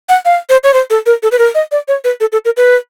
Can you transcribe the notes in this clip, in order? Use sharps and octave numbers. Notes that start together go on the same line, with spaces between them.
F#5
F5
C5
C#5
C5
A4
A#4
A4
B4
A#4
D#5
D5
C#5
B4
A4
A4
A#4
B4